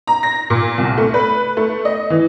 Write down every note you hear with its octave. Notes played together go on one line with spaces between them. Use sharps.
A#5
A#6
A#2
C2
A3
B4
A3
D#5
E3